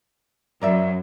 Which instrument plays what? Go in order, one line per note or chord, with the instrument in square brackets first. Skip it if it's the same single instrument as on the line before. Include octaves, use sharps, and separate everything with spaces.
[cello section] F#2 [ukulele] A#4 D5 E5